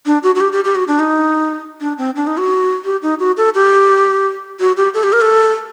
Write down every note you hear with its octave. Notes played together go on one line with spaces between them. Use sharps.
D4
F#4
F#4
G4
G4
G4
F#4
D4
D#4
D4
C4
D4
D#4
F#4
G4
D#4
F#4
A4
G4
F#4
G4
A4
G4
A#4
A4